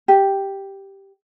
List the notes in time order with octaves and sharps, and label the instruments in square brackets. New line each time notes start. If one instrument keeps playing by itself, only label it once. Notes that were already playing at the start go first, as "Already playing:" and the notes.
[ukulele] G4